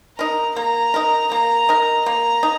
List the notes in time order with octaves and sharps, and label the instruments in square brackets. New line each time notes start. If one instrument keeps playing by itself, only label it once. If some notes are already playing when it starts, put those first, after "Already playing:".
[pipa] D#4 A#4 [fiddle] A#5
[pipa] A#3 [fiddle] A#5
[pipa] D#4 A#4
[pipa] A#3 [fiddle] A#5
[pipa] D#4 A#4
[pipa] A#3 [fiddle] A#5
[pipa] D#4